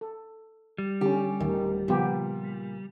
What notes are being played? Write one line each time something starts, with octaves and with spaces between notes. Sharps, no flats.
A4
G3
D3 C#4 G4
D1 D#3
A#2 C#3 F3 B3 G4